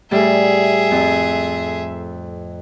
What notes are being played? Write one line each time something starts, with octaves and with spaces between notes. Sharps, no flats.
A2 G3 G#4 E5
F2